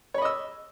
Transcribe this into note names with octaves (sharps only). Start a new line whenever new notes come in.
C#5 D#5 B5 E6